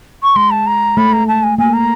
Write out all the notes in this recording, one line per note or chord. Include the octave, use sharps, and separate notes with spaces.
C#6
G#3 C6
A5
A#5
A3 B5
A#5
A5
G#5
A#3 G#5
A#5